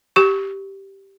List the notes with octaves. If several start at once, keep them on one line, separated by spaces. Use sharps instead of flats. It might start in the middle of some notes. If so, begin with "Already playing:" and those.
G4 C#6